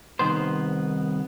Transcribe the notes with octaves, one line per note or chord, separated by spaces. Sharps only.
C2 D#3 B3 C5